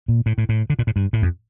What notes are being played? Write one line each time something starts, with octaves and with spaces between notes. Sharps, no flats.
A#2
A2
A2
A2
D3
A#2
A2
G2
A2
F2